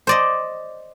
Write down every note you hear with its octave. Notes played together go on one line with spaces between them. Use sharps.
C5 D5 D#5